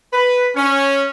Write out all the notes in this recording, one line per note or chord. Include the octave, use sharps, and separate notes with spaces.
B4
C#4